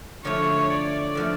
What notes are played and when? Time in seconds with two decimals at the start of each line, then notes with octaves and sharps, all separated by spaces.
0.24 D3 F3 A3 C#5
0.70 D5
1.15 D3 F3 A3